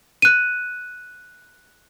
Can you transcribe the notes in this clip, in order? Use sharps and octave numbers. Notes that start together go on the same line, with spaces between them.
F#6 D#7